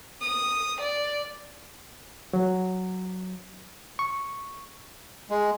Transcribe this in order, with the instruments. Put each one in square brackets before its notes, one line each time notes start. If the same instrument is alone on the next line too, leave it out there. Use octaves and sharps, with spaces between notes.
[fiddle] D#6
D5
[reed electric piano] F#3
C#6
[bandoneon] G#3